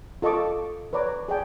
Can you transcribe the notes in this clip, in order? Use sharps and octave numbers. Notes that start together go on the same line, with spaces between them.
F4 A4 D#5 A5 C#6 D6
B4 C#5 D5 A#5 D6
G#4 D5 G5 A5